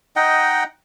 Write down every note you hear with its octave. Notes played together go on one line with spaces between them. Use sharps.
D#4 D#5 F#5 G5